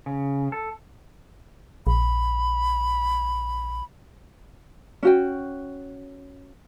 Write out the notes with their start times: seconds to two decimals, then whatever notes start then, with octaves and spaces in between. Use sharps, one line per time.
0.06 C#3
0.52 A4
1.87 A#1 B5
5.03 C#4 F#4 G5